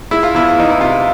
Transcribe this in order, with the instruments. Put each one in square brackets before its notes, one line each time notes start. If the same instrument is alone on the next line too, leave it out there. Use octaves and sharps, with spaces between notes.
[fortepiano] G#3 E4
F4
E2 E4
E3 D#4
E4
C3 F4